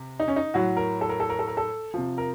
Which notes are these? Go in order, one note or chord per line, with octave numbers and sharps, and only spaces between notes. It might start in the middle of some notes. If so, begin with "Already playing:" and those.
Already playing: C3
D#4
C#4
D#4
A2 F#3 F#4
A#4
A4
A#4
A4
A#4
A4
A#4
A4
C3 F3
A#4